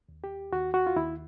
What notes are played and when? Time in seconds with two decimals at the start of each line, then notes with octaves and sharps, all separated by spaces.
0.09 D#2
0.24 G4
0.53 D#2 F#4
0.74 F#4
0.87 F4
0.97 D#2 E4